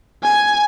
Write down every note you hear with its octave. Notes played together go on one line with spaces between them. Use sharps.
G#5